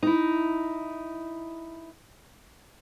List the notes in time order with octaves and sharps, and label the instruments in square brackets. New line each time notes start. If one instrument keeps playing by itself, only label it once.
[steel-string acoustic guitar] D#4 E4